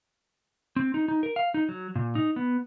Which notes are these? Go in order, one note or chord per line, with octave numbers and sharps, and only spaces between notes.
C4
D#4
D#4
A#4
F5
D#4
F#3
A#2
D#4
B3